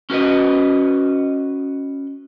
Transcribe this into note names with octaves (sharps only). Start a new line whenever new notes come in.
C#4 F#4 B4 D#5